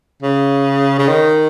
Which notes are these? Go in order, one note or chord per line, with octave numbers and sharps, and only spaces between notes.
C#3
C#3
D#3